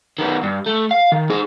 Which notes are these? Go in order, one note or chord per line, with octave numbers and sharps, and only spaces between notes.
D#3 B3
G2
A3
F5
D#3
D#4 G#4